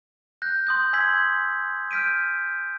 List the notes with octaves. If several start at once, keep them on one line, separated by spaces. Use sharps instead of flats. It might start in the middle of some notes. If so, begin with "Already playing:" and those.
F#6 G6 A#6
C6 D#6 G6
G#5 C6 E6 G#6 B6 F#7
F6 G6 B6 D7 D#7